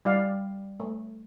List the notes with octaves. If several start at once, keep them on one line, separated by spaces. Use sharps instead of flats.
G3 E4 D5 F5
A3